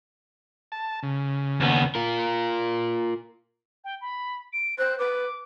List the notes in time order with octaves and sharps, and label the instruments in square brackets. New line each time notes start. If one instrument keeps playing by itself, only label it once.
[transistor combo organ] A5
C#3
[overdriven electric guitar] D#2 B3
F4 A#4
[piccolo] G5
B5
D7
[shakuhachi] C5 [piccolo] F#6
[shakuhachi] B4 [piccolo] D6